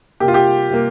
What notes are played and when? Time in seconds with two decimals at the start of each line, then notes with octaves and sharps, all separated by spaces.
0.20 C3 A#3 G4
0.28 F4
0.34 G4
0.70 C3 A#3